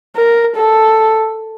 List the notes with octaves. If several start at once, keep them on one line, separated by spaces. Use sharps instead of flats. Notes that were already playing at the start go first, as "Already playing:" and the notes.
A#4
A4